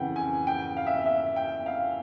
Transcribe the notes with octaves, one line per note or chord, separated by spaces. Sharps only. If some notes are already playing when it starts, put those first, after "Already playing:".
Already playing: F2 C#3 E3 F#5 G5
G#5
G5
F5
E5
F5
E5
G5
F5